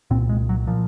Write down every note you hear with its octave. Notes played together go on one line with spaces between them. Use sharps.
C2 A#2 C4
G#3
F#3
A#2 F3